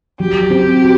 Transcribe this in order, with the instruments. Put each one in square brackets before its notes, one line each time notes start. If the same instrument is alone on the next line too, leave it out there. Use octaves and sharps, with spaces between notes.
[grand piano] F#3 [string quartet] G4
[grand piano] C4
F#4